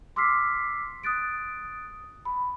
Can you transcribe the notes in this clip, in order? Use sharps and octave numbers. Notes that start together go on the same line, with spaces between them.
C6 D6 E6 F6 B6 C7
D#6 F#6 A6 D7
B5